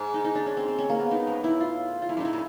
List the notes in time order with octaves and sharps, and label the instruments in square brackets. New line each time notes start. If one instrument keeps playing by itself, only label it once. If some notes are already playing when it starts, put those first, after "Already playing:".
Already playing: [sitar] G#2
[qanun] D#4
D#4
D4
C#4
C4
C4
C#4
A#3
B3
[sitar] G2 [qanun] D#4
[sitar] G#2
[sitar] A2 [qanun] E4
[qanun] F4
F4
[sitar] G#2 [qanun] E4
[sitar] F#2
[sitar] A2 [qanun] D#4 E4
[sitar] A#2